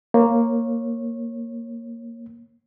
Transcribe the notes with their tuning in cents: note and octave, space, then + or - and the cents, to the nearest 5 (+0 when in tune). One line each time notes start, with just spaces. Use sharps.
A#3 +0 C#5 -20